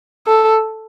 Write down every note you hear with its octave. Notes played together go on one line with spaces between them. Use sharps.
A4